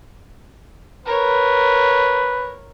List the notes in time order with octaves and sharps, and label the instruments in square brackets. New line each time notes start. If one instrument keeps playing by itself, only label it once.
[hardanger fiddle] A#4 C#5 [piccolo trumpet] B4